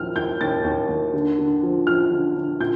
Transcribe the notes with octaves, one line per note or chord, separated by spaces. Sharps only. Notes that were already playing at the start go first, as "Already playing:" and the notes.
Already playing: D#2 F3 F6
D#2 G6
D#2 A6
D#2
D#2
D3
D3
F3
F3 F6
D3
D3
A#2 G6